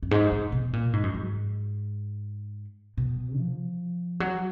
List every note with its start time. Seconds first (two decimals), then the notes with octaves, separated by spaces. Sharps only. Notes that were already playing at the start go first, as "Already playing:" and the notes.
0.03 F#2
0.11 G#2
0.32 G#2
0.52 B2
0.73 A#2
0.93 G#2
1.03 F#2
1.14 G#2
2.97 B2
3.38 F3
4.20 F#3